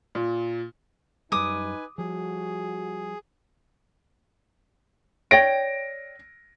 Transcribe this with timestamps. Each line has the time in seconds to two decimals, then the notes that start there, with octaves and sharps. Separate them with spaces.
0.15 A#2
1.32 F#2 F#3 G3 D#4 B4 G#5 D6 D#6
1.98 F3 G3 F#4 G#4
5.31 C#5 D5 G5 A#6 D7